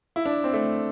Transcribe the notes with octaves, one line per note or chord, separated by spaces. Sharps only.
E4
D4
C4
A3